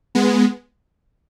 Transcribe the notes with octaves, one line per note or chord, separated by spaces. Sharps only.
G#3 B3